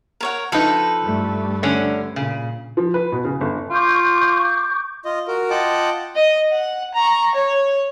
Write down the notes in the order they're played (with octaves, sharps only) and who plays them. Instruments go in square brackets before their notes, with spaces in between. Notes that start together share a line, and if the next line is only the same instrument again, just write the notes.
[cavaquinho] A#4 C#5 F#5
[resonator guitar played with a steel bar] F3 D#4 [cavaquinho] A4 B4
[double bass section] G2 G3 A3
[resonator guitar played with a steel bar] D3 C#4
[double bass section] A#2 [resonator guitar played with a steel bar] C#3
[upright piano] F3
B4
B2
C#3
G1
[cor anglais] F4 [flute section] C#6 D6 G6
[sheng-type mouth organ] F4 D#5
F#4 A#4
F4 D#5 F#5 G5 A5 D6
[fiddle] D#5
F#5
A#5 C#6
C#5